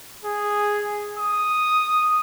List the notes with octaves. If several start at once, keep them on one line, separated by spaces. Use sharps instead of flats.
G#4
D#6